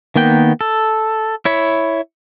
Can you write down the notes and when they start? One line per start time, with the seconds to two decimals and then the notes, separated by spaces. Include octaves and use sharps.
0.16 D#3 A#3 B3 G5
0.61 A4
1.45 E4 C#5 B5